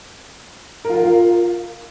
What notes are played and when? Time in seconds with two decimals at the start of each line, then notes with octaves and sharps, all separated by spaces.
0.85 A#4
0.90 F4
0.95 A#4
1.00 F4